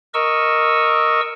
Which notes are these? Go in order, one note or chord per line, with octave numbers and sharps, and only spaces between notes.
A#4 D#5 C#6 E6